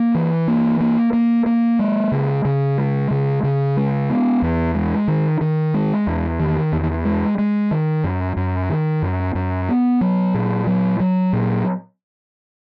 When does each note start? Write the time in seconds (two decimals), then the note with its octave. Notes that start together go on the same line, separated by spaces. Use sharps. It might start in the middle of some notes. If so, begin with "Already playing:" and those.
Already playing: A#3
0.15 E3
0.48 A#3
0.80 A#3
1.13 A#3
1.46 A#3
1.79 G#3
2.12 C#3
2.45 C#3
2.78 G#3
3.11 C#3
3.43 C#3
3.77 G#3
4.10 B3
4.42 E2
4.75 G#3
5.08 D#3
5.41 D#3
5.74 G#3
6.07 E2
6.39 D#3
6.72 E2
7.05 G#3
7.38 G#3
7.71 D#3
8.04 F#2
8.37 F#2
8.69 D#3
9.02 F#2
9.35 F#2
9.69 B3
10.01 F#3
10.34 A#2
10.67 F#3
11.00 F#3
11.33 A#2